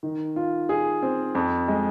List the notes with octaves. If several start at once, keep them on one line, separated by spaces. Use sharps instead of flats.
D#3
F4
G#4
C4
F2
G#3